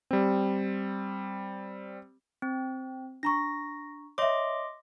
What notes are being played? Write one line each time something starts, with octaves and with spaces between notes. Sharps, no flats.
G3 C4
C4
D4 A#5 C#6 A#6
C#5 D#5 E5 C6 D6